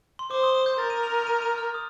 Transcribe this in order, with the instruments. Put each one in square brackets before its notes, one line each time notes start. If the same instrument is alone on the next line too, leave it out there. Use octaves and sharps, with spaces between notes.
[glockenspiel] C6
[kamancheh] C5 [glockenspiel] D6
[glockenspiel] D#6
D#6
G6
[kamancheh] A#4 [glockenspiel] A6
[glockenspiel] D#7
F7
D#7
D#7
D#7
F6
D#6